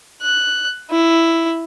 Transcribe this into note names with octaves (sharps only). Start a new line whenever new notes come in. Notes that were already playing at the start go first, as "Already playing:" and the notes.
F#6
E4